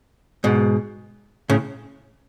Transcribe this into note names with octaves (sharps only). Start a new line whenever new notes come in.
G#2 B2
A2 C#3